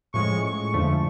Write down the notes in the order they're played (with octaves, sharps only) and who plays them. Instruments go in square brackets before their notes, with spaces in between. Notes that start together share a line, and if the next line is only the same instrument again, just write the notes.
[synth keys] A2 F3 G#3 C#4 [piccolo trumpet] C#6
[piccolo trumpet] C#6
[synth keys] F2 D3 F3 A3 [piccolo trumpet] C#6